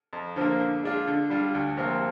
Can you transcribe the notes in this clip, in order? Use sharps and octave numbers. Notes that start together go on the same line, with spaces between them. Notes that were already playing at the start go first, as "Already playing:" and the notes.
F2
D3 F3 A#3
D3
G#3 D4 F4
D3
G3 D4 F4
D2
C3 F3 A#3